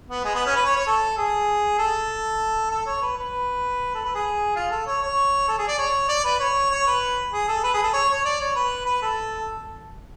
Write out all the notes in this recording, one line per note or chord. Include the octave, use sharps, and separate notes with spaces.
B3
G#3
B3
C#4
B4
C#5
C#5
A4
G#4
A4
A4
C#5
B4
B4
A4
B4
G#4
F4
A4
C#5
C#5
A4
G#4
D5
C#5
D5
B4
C#5
C#5
B4
G#4
A4
B4
G#4
A4
C#5
C#5
D5
C#5
B4
B4
A4